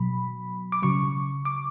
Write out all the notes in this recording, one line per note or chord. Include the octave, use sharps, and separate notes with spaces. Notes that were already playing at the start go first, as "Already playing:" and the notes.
Already playing: B2 F#3 B5
D6
C#3 F#3 C#6
D6